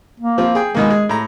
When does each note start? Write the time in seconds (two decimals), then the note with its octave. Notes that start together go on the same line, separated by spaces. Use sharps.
0.20 A#3
0.38 F3 C4 F4
0.55 G#4 G5
0.75 B2 D#3 G#3 A#3
0.90 G#4
1.09 A2 A#5